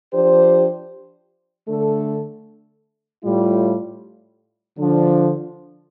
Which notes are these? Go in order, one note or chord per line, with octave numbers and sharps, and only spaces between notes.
F3 D4 G4 C5
D3 A3 D4 A4
A2 G3 F4
D3 F3 D4